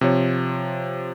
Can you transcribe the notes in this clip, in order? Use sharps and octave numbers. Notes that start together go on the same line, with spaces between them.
C3 F3 C#5